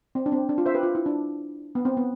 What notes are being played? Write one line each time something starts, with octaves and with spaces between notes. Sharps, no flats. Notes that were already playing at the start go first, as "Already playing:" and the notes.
C4
D4
C4
D4
F4
C5 E5
G4 B4
F4
E4
D4
B3
C4
B3